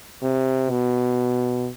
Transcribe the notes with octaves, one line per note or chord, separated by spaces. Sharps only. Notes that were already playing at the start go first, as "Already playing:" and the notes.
C3
B2